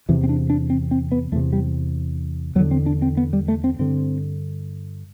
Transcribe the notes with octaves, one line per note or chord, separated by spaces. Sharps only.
E2 C3 E3
C4
D4
D4
C4
C4
B3
E2 C3 A3
G3
E2 D3 F#3
C4
D4
C4
B3
G3
A3
C4
G2 D3 C4